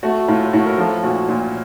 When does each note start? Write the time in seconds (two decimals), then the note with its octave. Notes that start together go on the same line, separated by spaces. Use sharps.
0.03 A3 F#4
0.28 A2 F4
0.44 F4
0.53 A2 F#4
0.66 A#4
0.78 F3 F4 A4
1.03 A#2 F#4
1.28 A#2 F4